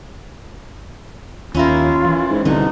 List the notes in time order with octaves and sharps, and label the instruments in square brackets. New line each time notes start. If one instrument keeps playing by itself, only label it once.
[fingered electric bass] D#2 [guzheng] C#4 E4 A#4 [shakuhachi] F4
[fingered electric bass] E3
[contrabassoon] G#2
[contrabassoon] C2 [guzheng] B2 [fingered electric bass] D3 [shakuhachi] D#4